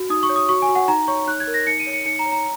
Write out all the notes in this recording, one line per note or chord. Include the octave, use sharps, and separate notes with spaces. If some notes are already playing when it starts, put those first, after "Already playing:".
Already playing: F#4
D#4 D#6
C#6
C#5
D#6
F#4 C#6
G#5
F#4
F#5
D#4 A#5
C#5 C#6
D#4 F#6
G#6
A#4
A#6
D#4 C#7
D#7
C#5
C#7
D#4 C#7
A#5
C#5
A#5